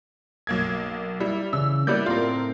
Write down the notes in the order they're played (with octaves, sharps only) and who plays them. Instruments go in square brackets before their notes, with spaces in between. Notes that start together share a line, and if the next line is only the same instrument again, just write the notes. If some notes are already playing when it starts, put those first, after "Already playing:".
[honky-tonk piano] B1 A#3 G#6
[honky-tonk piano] G3 [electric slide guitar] E4
[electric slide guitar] C#3 E3 [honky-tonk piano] E6
[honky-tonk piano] G3 D5 G6 [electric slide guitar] A#3 B3 E4
[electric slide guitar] A2 C4 [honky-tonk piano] F4 A#4